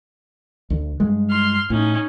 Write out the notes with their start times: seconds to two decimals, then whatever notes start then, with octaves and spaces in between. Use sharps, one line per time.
0.70 D2
1.00 G2 G#3
1.30 C6 F6
1.70 A2 C#4 D#4